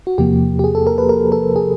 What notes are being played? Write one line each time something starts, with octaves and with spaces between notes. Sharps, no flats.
F#4
E2 C3 F3 A#3 G4
G4
G#4
A4
A#4
B4
A#4
A4
G#4